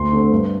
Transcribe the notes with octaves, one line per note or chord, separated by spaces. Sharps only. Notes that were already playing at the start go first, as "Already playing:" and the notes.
Already playing: D2 C6
D3 A3 C4
G2